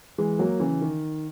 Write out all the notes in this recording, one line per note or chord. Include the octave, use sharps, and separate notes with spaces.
E3 G#3
F#3 A#3
C#3 E3
D#3